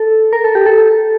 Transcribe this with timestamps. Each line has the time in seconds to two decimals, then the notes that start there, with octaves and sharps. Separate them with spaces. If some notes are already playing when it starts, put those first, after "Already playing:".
Already playing: A4
0.33 A#4
0.44 A4
0.55 G4
0.66 A4